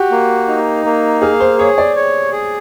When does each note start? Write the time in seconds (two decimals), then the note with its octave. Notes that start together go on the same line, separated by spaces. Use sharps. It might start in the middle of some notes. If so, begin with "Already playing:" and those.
Already playing: F#4 G4
0.11 A#3
0.48 D#4
0.85 A#3
1.22 G#4 F5
1.40 C5
1.58 G#4 C#5
1.78 D5
1.96 C#5
2.32 G#4